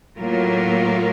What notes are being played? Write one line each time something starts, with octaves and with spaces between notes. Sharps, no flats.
A2 F#3 A#3 F4 A#4